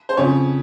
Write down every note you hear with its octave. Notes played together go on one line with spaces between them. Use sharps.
C5
F2 C#3 F3 C#5